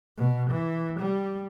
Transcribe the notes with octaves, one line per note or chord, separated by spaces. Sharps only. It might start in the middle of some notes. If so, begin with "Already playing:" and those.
B2
E3
G3